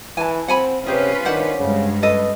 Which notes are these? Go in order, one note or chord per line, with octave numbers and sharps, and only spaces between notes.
E3 G#5 A5
C4 F#5 G#5 B5
C3 C#4 F4 G4 G#4 B4
D#3 D4 C5 F#5
G2 C#3 G#3
C#4 A4 B4 D#5